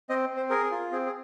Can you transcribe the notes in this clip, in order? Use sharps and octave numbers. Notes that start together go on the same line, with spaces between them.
C4 D#5
C4
C5
G#4 A#4
F4
C4 G#4
G#4